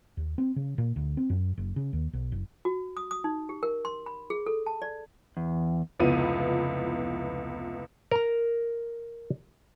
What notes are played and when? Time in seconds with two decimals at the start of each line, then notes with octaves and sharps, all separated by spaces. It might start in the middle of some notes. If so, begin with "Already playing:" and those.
0.17 D#2
0.38 C4
0.56 C#3
0.78 A#2
0.96 D2
1.17 C4
1.30 F#2
1.58 F#1
1.76 C#3
1.93 D#2
2.13 B1
2.32 F#1
2.65 F#4
2.97 D#6
3.11 D#6
3.24 D#4
3.49 G4
3.63 A#4
3.85 C6
4.06 B5
4.30 G#4
4.46 A4
4.66 A5
4.82 D5
5.37 E2
5.99 F1 C#2 F3 B3 E4 D#7
8.11 A#4 A#5